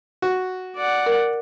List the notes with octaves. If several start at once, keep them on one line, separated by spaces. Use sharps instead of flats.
F#4
D5 F#5
A#4